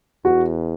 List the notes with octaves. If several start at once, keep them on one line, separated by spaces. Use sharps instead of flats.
E2 F#4